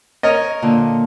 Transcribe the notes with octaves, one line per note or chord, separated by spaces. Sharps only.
A#4 C#5 D#5
A#2 D3